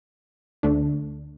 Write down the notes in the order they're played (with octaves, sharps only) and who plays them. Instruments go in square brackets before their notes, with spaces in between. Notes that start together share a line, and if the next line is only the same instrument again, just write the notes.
[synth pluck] D2 D3 A3 D4